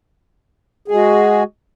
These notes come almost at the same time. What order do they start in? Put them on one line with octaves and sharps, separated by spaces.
G#4 G#3 F#4